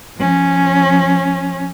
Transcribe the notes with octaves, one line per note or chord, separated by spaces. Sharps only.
F3 C#4